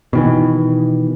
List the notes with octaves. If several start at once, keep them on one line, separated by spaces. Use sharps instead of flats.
B2 D#3 E3